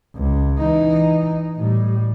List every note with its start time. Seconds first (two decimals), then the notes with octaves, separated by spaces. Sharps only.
0.15 C#2
0.58 E3 D#4
1.56 A2 G3